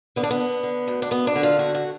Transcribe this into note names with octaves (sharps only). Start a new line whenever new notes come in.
D3 B3
D4
B3
D3
D3
D2
D4
D2 B3
D4
D3 F#4
F4
D2 F#4
F#4